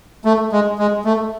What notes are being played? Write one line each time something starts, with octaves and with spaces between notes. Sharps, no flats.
A3
G#3
G#3
A3